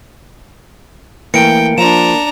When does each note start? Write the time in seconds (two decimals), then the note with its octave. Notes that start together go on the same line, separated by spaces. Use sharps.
1.34 E3 A3 A#3 G5 C#7 D7
1.78 F3 D4 F4 A#5 E7